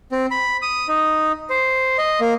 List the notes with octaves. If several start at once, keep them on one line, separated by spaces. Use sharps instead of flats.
C4
B5
D#6
D#4
C5
D#5
A#3